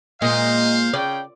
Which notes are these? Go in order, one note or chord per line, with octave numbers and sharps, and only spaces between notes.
A#2 G#3 C5 D#5 F5
C#3 D5 G5